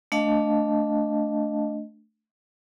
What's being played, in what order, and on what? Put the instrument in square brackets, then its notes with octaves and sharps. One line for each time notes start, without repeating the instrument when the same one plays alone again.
[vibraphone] A3 D4 D#5 F5 A5